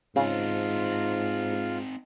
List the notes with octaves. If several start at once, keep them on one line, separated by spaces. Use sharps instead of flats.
G#2 C#3 C4 D#4 F4